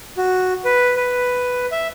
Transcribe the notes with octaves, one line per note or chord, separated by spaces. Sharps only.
F#4
B4
B4
E5